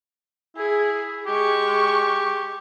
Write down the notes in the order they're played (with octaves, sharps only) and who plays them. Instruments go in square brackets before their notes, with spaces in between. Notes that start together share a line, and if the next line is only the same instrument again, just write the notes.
[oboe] E4 [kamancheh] G#4
[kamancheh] G#3 C#6 [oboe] G4